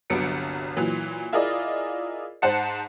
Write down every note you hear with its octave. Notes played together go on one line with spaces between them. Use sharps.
G1 C2 F#3 B3 C#7 D7
A#2 E3 F#3
E4 F4 G#4 A#4 D5 D#5
G#2 C5 F#5 A5 C#7